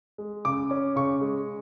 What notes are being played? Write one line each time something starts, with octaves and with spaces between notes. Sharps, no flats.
G#3
C#3 D6
C#4 D6
C#3 C#6
G#3